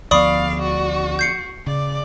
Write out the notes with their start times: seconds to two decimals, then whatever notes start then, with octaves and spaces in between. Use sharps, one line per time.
0.11 D2 F3 B3 D5 F5 B5 C#6 D#6
0.61 F#4
1.19 G6 C7 C#7
1.67 C#3 D5